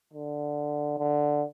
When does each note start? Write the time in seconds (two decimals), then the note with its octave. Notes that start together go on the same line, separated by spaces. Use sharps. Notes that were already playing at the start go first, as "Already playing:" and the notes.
0.13 D3
0.98 D3